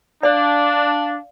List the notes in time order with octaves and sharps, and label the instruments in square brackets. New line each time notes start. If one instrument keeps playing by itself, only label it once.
[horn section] D4 [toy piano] D5 [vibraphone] F5